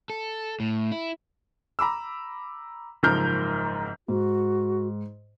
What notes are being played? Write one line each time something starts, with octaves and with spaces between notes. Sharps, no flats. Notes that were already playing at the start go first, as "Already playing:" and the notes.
A4
A2
E4
A#5 B5 D6 E6
F#1 G#2 F3 A#4 F6 G6
G#2 F#4